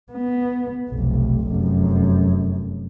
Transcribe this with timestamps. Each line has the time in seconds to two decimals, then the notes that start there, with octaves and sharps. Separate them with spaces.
0.12 B3
0.89 F1 B1
1.48 F1 F#2